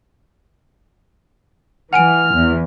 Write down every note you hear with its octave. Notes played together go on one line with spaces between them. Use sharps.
E3 F#5 G#5 F6 D7
E2